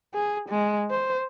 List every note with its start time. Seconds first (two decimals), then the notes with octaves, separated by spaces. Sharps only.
0.14 G#4
0.49 G#3
0.90 C5